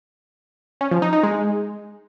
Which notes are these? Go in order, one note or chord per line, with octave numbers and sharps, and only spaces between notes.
C#4
F3
D#4
D#4
G#3